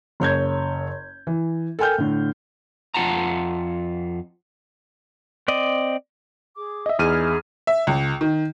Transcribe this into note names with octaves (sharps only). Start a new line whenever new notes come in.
F#1 C#5 G6 G#6
E3
A4 A#4 G5 G#5 F6 G6
A2 D3
F2 B2 F4 F#5 A5 A#5
C4 D5 D#5
G#4 D6
D#5 E5
E2 D#4 E4 G#4 F6 D#7
E5
C#2
D#3